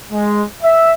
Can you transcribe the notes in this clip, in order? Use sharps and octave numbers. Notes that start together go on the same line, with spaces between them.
G#3
E5